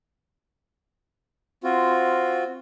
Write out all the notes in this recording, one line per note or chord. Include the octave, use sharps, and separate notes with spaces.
C4 F4 F#4